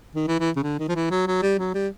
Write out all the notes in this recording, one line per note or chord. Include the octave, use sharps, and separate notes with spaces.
D#3
E3
E3
C#3
D3
D#3
F3
E3
F#3
F#3
G3
F#3
G3